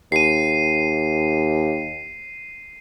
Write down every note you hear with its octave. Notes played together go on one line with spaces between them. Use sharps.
D#2 C7 D#7